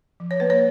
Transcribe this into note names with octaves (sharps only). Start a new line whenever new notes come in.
F3
C#5
A#3 B4
C#5